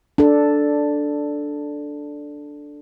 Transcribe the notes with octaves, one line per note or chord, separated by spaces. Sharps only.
D4 A4